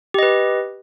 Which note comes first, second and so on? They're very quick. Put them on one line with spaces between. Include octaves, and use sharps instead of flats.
G4 D#5 B4